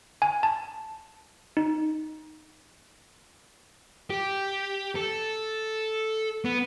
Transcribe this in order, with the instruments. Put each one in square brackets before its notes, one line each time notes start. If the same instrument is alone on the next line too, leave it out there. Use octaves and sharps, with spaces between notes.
[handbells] G#5
A5
D#4
[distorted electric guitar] G4
A4
B3